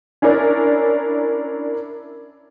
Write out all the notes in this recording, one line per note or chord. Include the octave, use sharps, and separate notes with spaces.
C#4 D4 E4 A#4 D5